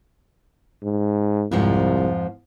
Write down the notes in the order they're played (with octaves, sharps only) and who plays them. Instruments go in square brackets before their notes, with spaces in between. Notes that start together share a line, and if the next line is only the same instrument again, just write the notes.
[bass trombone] G#2
[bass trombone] C2 [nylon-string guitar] F2 G#2 F3